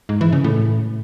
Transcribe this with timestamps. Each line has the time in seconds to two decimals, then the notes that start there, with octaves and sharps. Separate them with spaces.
0.09 G#2
0.21 E3
0.33 C#3
0.44 A2